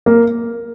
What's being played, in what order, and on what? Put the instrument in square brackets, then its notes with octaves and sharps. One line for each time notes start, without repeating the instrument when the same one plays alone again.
[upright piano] A#3